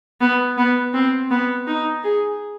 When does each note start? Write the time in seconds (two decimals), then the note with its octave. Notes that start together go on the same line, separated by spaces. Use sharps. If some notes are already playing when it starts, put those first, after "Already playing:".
0.21 B3
0.57 B3
0.94 C4
1.31 B3
1.67 D#4
2.04 G#4